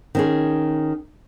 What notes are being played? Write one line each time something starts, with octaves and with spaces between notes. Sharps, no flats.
D#3 C#4 G#4